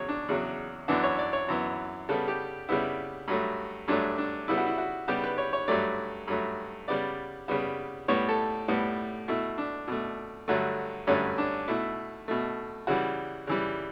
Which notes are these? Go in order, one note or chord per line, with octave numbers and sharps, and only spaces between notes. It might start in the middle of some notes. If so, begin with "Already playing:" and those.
Already playing: E2 C#3 F#3 C#5
D4
E2 C#3 F#3
F#2 E3 B3 D4
C#5
D5
C#5
F#2 E3 B3
C#3 G3 B3 A4
G4
C#3 G3 B3 E4
G2 F#3 A3
G2 F#3 A3 D4
D4
C#3 G3 B3 E4
F#4
E4
F#4
C#3 G3 B3 G4
B4
C#5
C#5
G2 F#3 A3 D5
G2 F#3 A3
C#3 G3 B3 D5
C#3 G3 B3
A2 G3 B3 C#5
A4
A2 G3 B3
B2 A3 E4
D4
B2 A3
G2 D3 F#3 A3
G2 D3 F#3 A3 C#4
D4
B2 A3 E4
B2 A3
C#3 E3 G3 F#4
C#3 E3 G3